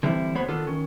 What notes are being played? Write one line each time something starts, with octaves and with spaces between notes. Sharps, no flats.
D3 E3 G3 C4 E4
D2 D3 B3 C5 C#5 B5
D#3 B3 D4 F4 A4
D#3 C#4